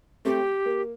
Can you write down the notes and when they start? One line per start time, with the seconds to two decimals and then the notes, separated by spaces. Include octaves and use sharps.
0.25 A3 C4 G4
0.65 A#3